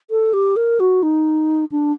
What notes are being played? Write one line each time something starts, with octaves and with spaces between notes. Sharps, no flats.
A4
G4
A#4
F#4
D#4
D4